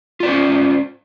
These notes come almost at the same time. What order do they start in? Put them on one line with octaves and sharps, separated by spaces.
F4 D5 C5 C#4